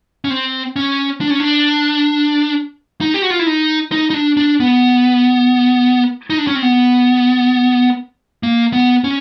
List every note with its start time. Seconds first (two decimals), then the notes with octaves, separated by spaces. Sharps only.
0.25 C#4
0.30 C4
0.76 C#4
1.21 D4
1.30 C#4
1.40 D4
3.01 D#4
3.14 G4
3.22 F#4
3.30 F4
3.39 E4
3.47 D#4
3.92 D#4
4.10 D#4
4.14 D4
4.37 D4
4.60 B3
6.30 D#4
6.38 D4
6.47 C#4
6.55 C4
6.62 B3
8.43 A#3
8.73 B3
9.04 C#4